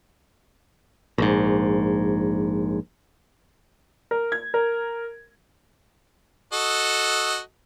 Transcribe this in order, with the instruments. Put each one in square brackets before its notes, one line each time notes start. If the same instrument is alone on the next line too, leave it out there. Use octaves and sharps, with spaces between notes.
[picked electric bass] A#1 G#2
[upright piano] A#4
G#6
A#4
[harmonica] F#4 A4 D#5